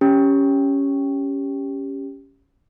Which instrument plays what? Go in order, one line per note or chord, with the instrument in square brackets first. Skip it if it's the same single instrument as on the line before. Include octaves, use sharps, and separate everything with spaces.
[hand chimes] C#4 G4